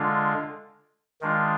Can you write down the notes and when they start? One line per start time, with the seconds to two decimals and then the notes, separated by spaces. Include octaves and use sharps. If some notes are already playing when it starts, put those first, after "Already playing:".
Already playing: D3 G#3 D4 F4
1.21 D#3 G#3 D4 F4